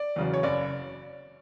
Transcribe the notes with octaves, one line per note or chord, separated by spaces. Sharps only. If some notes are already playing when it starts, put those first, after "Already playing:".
Already playing: D5
E2 C#3 F#3
C#5
F#1 D5